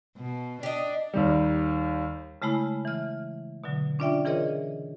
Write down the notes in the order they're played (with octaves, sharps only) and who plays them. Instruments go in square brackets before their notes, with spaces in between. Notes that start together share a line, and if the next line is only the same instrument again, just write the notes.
[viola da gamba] B2
[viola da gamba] D4 [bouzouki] G4 D#5
[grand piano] D#2 D#3 G3
[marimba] C#3 G#3 A3 E4 B5
E3 F6
B2 D3 F#3
C#4 D4 F4 D5 E5 G5
E3 F4 G#4 A#4 C#5 D#5